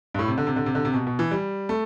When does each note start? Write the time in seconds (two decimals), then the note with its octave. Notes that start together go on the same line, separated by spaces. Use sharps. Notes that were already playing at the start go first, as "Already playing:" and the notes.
0.14 G2
0.19 A2
0.28 C3
0.38 D3
0.47 C3
0.56 D3
0.66 C3
0.75 D3
0.85 C3
0.94 B2
1.07 B2
1.19 E3
1.31 G3
1.69 A3